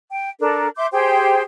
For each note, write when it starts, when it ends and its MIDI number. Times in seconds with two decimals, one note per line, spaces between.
0.11 0.30 79
0.39 0.68 62
0.39 0.68 69
0.39 0.68 70
0.77 0.87 76
0.77 0.87 84
0.77 0.87 86
0.77 0.87 91
0.92 1.42 67
0.92 1.42 68
0.92 1.42 72
0.92 1.42 79